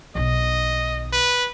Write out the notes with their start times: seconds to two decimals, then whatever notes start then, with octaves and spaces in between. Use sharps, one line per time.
0.15 B1 D#3 D#5
1.13 B4